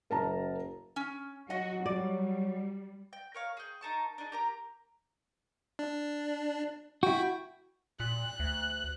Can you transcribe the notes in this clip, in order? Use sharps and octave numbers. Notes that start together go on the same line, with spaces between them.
F#1 A#4 A5 A#5
C#4
F#3 F#4 D#5 F#5
G3 D5
G5
A#4 C#5 F5
G#4 G5
D#4 A#4 A5 C#6
D4 D#4 G#4
G4 A#4 A#5
D4
E4 F#4 G5
A#2 F#6
D2